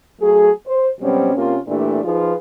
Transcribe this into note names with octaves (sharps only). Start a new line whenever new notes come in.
F#3 A3 G#4
C5
B2 F#3 G3 C4 C#4
C3 A#3 C#4 F4
A#2 E3 A3 D4 G4
F3 D#4 F4 G#4 B4